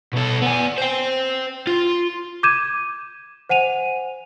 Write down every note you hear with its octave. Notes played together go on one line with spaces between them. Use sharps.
B2 A4
B3 G#5
C5 G5
F4
D6 G6 G#6 D#7 E7
C5 F#5 G#5 D#7 F7